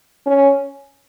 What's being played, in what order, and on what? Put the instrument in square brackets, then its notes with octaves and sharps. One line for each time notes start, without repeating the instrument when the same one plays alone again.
[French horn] C#4